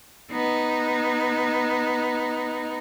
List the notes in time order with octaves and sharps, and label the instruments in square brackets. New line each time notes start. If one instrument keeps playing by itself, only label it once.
[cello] B3 D#4